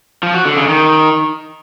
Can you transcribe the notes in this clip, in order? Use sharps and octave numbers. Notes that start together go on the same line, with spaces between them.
F3
F#4
D3
C#3
D#3